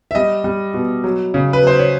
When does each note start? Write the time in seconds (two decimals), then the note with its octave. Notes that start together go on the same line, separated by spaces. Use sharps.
0.11 E5
0.15 G3 D#5
0.44 G3
0.74 B2
1.04 F#3
1.34 C#3
1.53 B4
1.63 F#3 C5
1.79 C#5